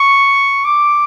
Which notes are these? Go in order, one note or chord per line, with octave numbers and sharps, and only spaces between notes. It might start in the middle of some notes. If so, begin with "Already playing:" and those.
Already playing: C#6
D6